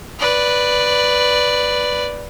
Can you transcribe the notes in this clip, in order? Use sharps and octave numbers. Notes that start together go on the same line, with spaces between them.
B4 D5